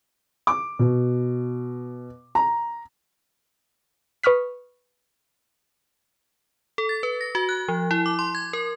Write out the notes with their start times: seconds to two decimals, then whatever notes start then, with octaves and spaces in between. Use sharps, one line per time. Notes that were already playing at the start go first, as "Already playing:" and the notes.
0.47 D6
0.79 B2
2.35 A#5
4.23 B4 C#6 D#6 F6 B6
6.78 A4
6.89 A6
7.03 B4
7.21 A#6
7.35 F#4
7.49 F#6
7.68 F3
7.91 E4
8.06 D6
8.19 C6
8.35 G#6
8.53 A#4